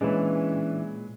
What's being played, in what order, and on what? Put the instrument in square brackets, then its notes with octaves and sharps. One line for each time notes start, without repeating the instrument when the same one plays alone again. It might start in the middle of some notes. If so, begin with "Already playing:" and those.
[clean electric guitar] A#2 [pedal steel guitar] E3 D4 [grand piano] G#3 B4 C#5 [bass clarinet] C#4